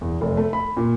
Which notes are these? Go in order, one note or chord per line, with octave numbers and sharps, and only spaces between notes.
E2
F1
A3
B5
A#2